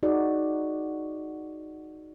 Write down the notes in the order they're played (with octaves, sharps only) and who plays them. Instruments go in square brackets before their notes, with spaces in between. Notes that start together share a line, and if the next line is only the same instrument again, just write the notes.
[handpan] D#4 F#4 G#4 D5